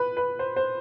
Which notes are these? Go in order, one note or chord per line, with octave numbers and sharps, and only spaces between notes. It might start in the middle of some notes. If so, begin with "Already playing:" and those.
Already playing: B4
B4
C5
C5